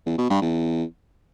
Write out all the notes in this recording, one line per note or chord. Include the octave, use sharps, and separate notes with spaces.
E2
B2
G2
E2